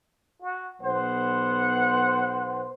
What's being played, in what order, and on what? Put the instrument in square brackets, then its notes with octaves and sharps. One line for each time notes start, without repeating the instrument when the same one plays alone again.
[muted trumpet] F#4
[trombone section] B1 B3 C5 [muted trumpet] F#5